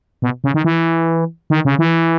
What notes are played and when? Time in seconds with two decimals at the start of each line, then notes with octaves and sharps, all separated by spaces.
0.22 B2
0.44 C#3
0.54 D#3
0.64 E3
1.50 D#3
1.65 C#3
1.79 E3